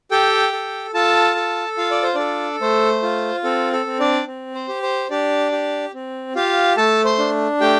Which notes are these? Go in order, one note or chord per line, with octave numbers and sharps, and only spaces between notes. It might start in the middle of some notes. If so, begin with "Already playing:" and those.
G4 A4 G5
A4
F4 A4 A5
A4
F4 F5
D5
C5
D4 A4 D5
A3 C5
F4
C4 A4
A4
C4
D4 D5
C4
C5
G4
C5
D4 G4 D5
G4
C4
F4 G4 F5
A3 A4 A5
C5 C6
D4
A3 G4 G5